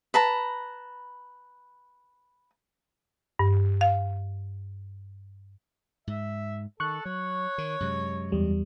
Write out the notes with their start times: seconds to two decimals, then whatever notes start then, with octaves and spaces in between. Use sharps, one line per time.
0.14 B4 A5 A#5
3.39 G2
3.81 F5
6.07 G#2 E5
6.80 D#3 A4 C#6 F#6
7.05 F#3 C#5
7.58 D#3
7.80 F#2 C3 G#3
8.32 E2 G3